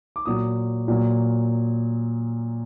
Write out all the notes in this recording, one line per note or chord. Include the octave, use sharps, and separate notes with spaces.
D6
A#2 F#3 D#6
A#2 F#3